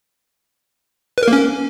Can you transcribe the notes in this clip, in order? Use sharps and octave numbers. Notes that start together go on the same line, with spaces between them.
B4
A#4
A#3
C#4